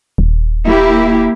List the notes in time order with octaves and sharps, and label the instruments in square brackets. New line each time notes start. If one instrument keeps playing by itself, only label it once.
[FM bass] D#1
[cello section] A#3 E4 G4